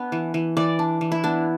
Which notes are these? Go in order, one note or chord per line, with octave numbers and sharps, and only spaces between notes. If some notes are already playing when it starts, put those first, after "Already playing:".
Already playing: B3 D4
E3
E3
E3 D5
D4
E3
E4
B3 D4